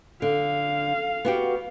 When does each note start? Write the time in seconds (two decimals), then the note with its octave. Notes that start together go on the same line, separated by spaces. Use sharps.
0.22 D3 F5
1.25 B3 F#4 G4